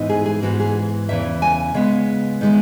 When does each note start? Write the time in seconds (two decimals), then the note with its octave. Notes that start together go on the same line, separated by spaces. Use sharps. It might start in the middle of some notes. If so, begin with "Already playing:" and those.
Already playing: G#2 E3 B3 D#4
0.09 G#4
0.26 G#4
0.42 G#2 E3 B3 F#4
0.60 G#4
1.09 E2 C#3 E3 E5
1.42 G#5
1.74 C#3 G#3 B3
2.41 D#3 G#3 B3